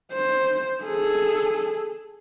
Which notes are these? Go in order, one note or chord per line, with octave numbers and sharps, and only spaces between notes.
C5
G#4 A4